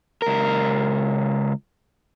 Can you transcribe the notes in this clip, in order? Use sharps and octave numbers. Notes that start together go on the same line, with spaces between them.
C#2 A#4